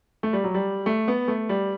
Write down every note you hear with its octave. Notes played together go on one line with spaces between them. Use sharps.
A3
G3
F#3
G3
A3
B3
A3
G3